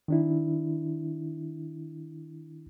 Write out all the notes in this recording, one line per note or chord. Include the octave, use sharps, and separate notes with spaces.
D#3 D4 E4